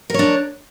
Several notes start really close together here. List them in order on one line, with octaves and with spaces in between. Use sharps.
A#4 C#5 D4